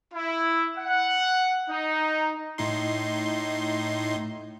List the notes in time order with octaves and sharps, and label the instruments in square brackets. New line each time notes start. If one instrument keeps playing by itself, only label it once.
[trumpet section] E4
F#5
D#4
[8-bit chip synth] A2 D#4 C6